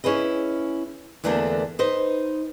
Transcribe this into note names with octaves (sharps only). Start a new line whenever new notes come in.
C#4 E4 G#4 B4 D#5
E2 D3 E3 A3 A#3 D4
D#4 B4 C5 D#5